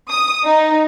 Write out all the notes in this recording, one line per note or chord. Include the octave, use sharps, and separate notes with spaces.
D#6
D#4